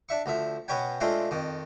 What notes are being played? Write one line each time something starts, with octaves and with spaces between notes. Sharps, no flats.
D4 E5 C#6
D2 F3 E5
B2 B3 C#4 G5 G#5
G#3 A3 C4 D4 F4 G#4
F2 D#3